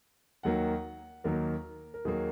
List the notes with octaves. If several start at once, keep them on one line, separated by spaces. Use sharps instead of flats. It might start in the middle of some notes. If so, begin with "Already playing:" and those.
D#2 D#3 F#3 A#3 F#5
D#2 D#3 F#3 A#3 A#4
A#4
D#2 D#3 F#3 A#3 G#4